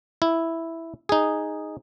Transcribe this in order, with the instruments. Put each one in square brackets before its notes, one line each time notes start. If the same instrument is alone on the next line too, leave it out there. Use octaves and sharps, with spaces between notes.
[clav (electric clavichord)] E4
D#4 G#4